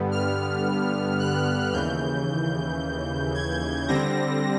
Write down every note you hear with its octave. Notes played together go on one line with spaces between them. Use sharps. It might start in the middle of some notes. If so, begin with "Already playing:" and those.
Already playing: G2 D3 G3 B3
F6
F#6
D#2 C#3 E3 G6
G#6
D3 G3 C4 A#6